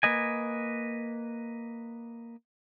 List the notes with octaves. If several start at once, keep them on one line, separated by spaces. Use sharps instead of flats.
A#3 B4 D#5 G#5